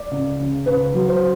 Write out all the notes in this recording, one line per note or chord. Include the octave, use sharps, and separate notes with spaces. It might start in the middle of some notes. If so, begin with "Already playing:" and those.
Already playing: D5
C#2
C#3
C#2 B4
F#3
C5